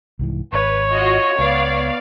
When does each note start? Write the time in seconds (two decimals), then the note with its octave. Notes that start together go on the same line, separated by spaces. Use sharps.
0.19 C2 G#2 E3
0.53 G#1 B4 C#5
0.92 F4 F#4 D#5
1.39 C#2 B3 D5 F5